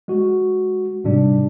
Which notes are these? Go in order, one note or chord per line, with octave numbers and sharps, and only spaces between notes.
G#3 F#4
G#2 C3 G3 D4